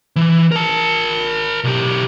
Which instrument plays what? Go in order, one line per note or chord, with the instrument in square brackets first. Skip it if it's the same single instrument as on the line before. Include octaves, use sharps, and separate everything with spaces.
[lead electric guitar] E3
A#4 A5
B1 G4